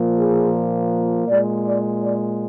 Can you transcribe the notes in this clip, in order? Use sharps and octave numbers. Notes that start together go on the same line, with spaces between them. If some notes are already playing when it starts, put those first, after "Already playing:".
Already playing: A#2 F3 A#3
G#4
A#2 G#3 D5
D5
D5